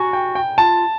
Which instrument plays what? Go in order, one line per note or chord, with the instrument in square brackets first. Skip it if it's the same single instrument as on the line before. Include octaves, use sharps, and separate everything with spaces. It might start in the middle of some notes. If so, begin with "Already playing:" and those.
Already playing: [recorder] F#4 [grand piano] G#5 A#5
[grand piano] G5
G5
[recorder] F4 [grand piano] A5